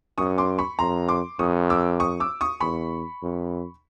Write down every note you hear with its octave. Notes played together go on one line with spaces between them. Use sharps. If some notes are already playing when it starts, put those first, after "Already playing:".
F#2 C#6 D#6
C6 D6
B5 C#6
F2 A#5 C6
C6 D6
F2 C#6 D#6
D6 E6
C#6 D#6
D6 E6
C#6 D#6
E2 B5 C#6
F2